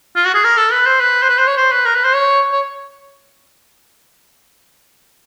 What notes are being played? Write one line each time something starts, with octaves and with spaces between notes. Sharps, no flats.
F4
F#4
G#4
A#4
A4
B4
C5
B4
C5
B4
C5
C#5
C5
B4
A#4
B4
C5
C#5
C#5